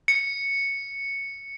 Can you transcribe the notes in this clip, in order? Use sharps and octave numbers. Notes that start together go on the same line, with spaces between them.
C#7